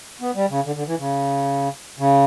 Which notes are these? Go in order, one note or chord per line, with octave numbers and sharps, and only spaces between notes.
B3
G3
C#3
D3
D3
E3
C#3
C#3